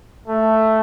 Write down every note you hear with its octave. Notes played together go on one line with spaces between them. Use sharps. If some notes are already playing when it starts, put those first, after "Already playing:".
A3